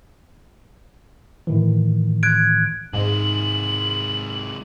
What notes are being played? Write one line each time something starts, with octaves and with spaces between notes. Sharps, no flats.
A2 D#3 E3
F#6 G#6 D7
G#2 C3 G#3 F#7